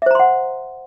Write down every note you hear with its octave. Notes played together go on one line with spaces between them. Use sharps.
C5 E5 F#5 A#5 C6